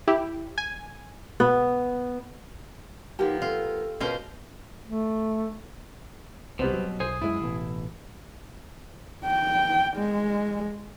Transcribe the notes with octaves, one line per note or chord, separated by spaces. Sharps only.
E4 G4
G#5
B2 B3
F3 A#3 B3 D#4 G4
F4 A4
B2 G#3 A#3 C#4 F4 C5
A3
C2 B2 G3 B3 C4
F#3
B1 G#4 C5 G#5
F#2 G#3 E4
A1 B2
G5
G#3